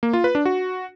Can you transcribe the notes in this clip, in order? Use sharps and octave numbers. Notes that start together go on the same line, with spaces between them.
A#3
F4
B4
D4
F#4